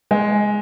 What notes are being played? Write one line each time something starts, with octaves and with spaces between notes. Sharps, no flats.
G#3